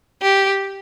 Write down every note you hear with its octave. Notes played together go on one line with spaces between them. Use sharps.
G4